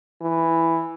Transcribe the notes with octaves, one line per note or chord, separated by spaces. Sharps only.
E3